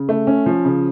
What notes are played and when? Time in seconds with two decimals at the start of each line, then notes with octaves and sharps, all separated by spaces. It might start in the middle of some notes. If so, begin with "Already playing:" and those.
Already playing: C#3
0.09 A3
0.27 C#4
0.46 F3
0.65 C#3